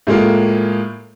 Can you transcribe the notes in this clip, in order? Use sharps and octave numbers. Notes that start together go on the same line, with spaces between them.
A2 G#3 A#3 F4